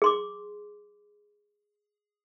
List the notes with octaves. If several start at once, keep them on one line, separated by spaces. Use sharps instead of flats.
G#4 C6 D6